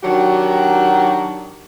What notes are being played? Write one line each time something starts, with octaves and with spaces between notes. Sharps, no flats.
D#3 F#3 D4 F#4 G4